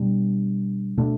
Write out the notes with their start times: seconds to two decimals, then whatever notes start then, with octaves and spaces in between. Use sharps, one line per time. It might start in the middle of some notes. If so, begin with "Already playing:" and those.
Already playing: B2 G3 D4
0.98 B2 A3 D4